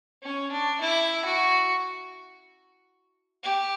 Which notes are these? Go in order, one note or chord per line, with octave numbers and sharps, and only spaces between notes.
C#4
D4
E4
F#4
G4